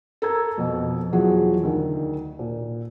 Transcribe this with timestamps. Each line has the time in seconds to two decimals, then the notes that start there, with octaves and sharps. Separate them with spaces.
0.22 A4 A#4 A#5 G#6
0.58 F2 B2
1.12 E2 F3 F#3 G#4 F#5
1.63 D2 D#3
2.39 A#2